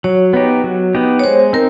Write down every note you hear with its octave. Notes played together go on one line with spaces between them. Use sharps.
F#3 C#5
B3 D#4 G4
F#3
B3 D#4 G4
C#5
G#3 C5
C4 D#4 A#4